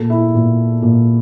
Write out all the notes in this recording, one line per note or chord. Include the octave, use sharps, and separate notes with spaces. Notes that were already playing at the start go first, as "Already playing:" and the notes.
Already playing: A#2 A4
E4
A#2
A#2